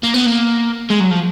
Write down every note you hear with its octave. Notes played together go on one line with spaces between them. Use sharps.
A#3
B3
A#3
G#3
F#3
F3